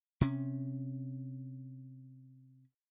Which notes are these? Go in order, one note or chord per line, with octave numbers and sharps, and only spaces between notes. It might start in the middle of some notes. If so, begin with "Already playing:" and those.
C3 C#4